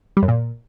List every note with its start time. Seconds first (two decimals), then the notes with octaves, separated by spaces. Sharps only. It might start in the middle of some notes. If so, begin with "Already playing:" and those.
0.17 G3
0.22 F#2
0.28 A#2